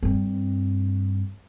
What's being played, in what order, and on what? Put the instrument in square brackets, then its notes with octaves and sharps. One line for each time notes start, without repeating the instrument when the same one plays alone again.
[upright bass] G2 C4